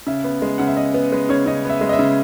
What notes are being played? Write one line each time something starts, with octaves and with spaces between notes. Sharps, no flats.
C#3 E5
B3
G#3
C#3 F#5
E5
C#3 D#5
B3 B4
G#3 B4
C#3 C#5
C#3 D#5
B3 E5
G#3
D#5
E5
C#3